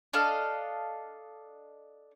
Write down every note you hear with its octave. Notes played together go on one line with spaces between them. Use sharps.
D4 A4 D#5 F5